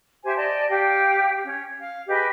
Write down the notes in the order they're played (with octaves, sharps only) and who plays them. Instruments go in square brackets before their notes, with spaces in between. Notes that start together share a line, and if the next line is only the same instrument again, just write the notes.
[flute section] G4 C5 E5 G#5
D5 D#5 A5
G4 F5 G5
C#4 C#5
F5
G4 G#4 B4 D#5